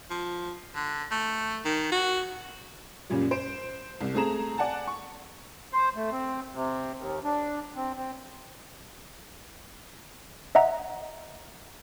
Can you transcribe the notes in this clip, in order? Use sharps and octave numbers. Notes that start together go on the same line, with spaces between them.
F3
D3
A3
D#3
F#4
F#2 A#2 C#3 G3
C5 D7
C2
A3 C4 G#4 A#5 E7
D5 F#5 G#5 A5
C#6
C5
A3
C4
C3
D#2
D4
C4
C4
D#5 E5 F#5 A#5